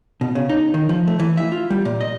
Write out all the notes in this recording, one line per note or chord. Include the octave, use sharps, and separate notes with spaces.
B2
C#3
D#4
D#3
F3
A3
E3
E5
F4
G3
A#2
D#5